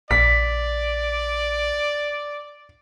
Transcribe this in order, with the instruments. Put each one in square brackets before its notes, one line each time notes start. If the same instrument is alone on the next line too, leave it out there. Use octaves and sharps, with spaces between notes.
[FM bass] A#1 [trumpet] D5 [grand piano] B6